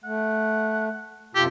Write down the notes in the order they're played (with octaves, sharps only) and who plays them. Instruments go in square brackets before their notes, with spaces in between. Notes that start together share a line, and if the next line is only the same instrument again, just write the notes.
[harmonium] A3 [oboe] F#5
[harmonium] F#2 C3 F4 [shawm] G4 [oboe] A4